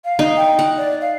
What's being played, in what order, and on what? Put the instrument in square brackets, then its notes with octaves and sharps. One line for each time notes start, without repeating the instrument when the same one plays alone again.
[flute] F5
[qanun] D#4
[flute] G5
[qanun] F#5
[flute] D5
F5